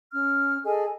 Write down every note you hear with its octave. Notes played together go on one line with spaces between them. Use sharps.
C#4 F6
G#4 A4 D#5 G#5